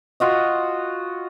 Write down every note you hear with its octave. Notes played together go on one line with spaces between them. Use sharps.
F4 F#4 D#5